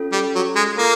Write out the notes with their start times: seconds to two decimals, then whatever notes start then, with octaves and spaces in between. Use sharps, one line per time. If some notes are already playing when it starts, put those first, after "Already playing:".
Already playing: C#4 F4 A4
0.12 G3
0.35 F#3
0.56 G#3
0.78 A#3 F4 A4